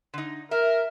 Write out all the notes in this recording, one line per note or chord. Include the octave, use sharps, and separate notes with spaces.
D3 D#4
A#4 E5